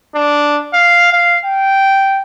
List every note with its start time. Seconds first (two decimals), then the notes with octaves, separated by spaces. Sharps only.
0.15 D4
0.73 F5
1.12 F5
1.45 G5